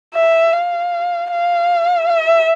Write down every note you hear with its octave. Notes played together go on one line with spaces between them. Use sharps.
E5
F5
F5
E5